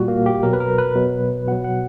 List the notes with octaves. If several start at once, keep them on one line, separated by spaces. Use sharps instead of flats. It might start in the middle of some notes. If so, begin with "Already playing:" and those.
Already playing: A#2 G3 F#4
A#3
G4
B2 F#3 A#4
B4
A#4
B4
B2 F#3
B2 F#3 F#5
F#5